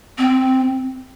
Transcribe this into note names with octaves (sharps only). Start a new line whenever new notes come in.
C4